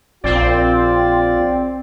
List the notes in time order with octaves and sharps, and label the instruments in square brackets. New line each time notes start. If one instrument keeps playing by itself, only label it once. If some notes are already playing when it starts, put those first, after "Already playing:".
[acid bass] A#1 [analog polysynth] C4 [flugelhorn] F4 [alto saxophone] D5